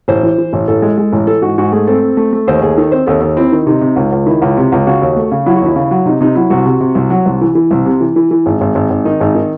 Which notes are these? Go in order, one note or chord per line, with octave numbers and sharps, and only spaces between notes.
A1 C5
E3
E3
A1
A1 A4
G#3
G#3
A1
E3 A4
G#2 F#4
G#2 F#4
A3 G#4
C4 A4
C4
A3
A3
D#2 C5
D#2 G#4
D#3 A4
C4 C5
D#2 A4
D#2
C4 E4
D#3
C3 D#4
C3
C#2
C#2
D#3 E4
C#2
C3
C#2
C#3 F#4
D#2
A3
C#3
F#3 E4
F#4
D#2 E4
C#3
F#3
C3 D#4
C3 D#4
F#3 E4
C2 F#4
C3
C3
C2
F#3
C2
E3
E3
C2
C3
E3
E3
E3
G#1
G#1
G#1
G#1
D#3 D#4
G#1
D#3